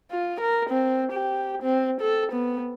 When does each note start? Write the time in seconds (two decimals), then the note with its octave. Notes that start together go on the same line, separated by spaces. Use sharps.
0.11 F4
0.40 A#4
0.70 C4
1.12 G4
1.63 C4
2.01 A4
2.32 B3